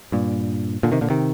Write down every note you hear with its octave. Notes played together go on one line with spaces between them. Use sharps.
G2 A#2
A#2 D3
C3 D#3
A#2 D3
C3 D#3